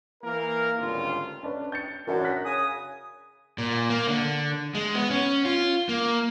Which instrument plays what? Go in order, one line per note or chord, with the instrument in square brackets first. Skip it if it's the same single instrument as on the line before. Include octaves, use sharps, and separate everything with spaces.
[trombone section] E3 A#3 A#4
G#1 D2 G2 C#3 F4
[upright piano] C#4 D4 B4
G6 A6 C#7
[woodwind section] F#2 [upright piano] E3 D4 F#4
[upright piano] F#6 A#6 B6
[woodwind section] C#3 G#5 D#6
[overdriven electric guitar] A#2
A#3
D3
G#3
B3
C#4
F4
A#3